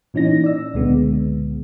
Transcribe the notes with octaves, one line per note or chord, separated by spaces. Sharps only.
A#2 E3 C#4 D#4 A#6
D5 E6
C#2 A#2 D3 G#3 B3